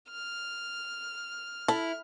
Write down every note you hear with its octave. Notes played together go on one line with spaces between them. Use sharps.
F6
E4 A4